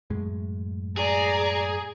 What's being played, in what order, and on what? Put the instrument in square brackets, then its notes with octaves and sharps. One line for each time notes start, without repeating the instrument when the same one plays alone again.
[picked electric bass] F#2 A2 G#3
[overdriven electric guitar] G#4 [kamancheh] D5 [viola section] A#5